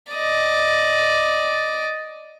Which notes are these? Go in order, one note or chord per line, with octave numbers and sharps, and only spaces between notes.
D5 D#5